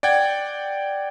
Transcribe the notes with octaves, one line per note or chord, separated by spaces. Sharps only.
D5 F#5 G5 G#6